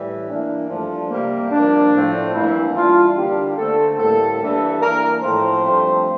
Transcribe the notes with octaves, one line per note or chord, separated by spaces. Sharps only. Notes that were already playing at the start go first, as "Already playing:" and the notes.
Already playing: A2 E3 G3
E3 A#3 D4
G2 F3 A3 D4
C3 G3 A#3
G2 F3 A#3 D4
A2 F3 A3 C4
G2 E3 A#3 D4 E4
E3 G3 D4 F4
D3 G3 A#3 D4 G4
D3 A3 C4 A4
A2 G3 A#3 A4
G2 E3 G3 D4 A4
E3 A#3 D4 A#4
A2 F3 A3 C4 C5
G2 F3 A3 C4